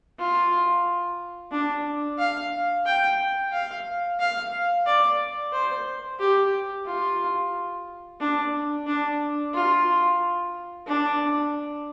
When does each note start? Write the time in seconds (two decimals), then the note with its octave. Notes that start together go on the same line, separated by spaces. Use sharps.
0.19 F4
1.52 D4
2.19 F5
2.86 G5
3.53 F5
4.20 F5
4.86 D5
5.53 C5
6.20 G4
6.86 F4
8.20 D4
8.87 D4
9.54 F4
10.87 D4